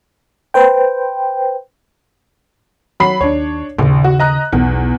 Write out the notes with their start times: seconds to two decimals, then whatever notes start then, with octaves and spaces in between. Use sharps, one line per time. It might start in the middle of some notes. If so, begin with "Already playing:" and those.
0.54 B4 C5 G5
3.00 F#3 B5 C7
3.21 D#2 D4 C#5
3.78 A#1 D#2 C#3
4.04 F#4
4.19 D#5 A#5 F#6
4.53 B1 E2